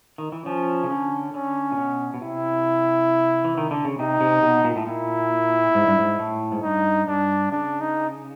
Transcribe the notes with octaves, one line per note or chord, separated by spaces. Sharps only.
D#3
E3
F3 C#4
C#3
D3
D3 C#4
A#2
B2
B2
C3 E4
E3
D#3
D3
C#3
C3 D#4
C3
B2
A#2
A2
A#2 E4
G#2
G2
G#2
A2
G#2
G2 D#4
G2 D4
C#3 D4
D#4